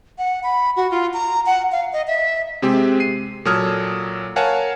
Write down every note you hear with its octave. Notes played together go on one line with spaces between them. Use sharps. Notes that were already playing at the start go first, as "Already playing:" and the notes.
F#5
B5
F#4
F4
A#5
F#5
F5
D#5
E5
C3 G#3 C4 G4
C7 D#7
A#2 F#3 A4 D#6 F6 G#6
A#4 C#5 F5 F#5 G#5 A5